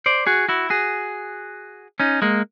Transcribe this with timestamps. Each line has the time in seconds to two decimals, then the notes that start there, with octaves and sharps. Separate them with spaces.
0.06 C5 D5
0.26 F#4 G#4
0.48 E4 F#4
0.70 F#4 G#4
2.00 C#4 D#4
2.22 G#3 A#3